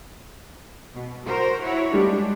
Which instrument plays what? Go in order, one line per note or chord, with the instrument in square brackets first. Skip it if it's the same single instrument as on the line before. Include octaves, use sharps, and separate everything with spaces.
[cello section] B2
F#4 A#4 C5
E4 F#4 C#5
[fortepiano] G3 [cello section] G#3 D4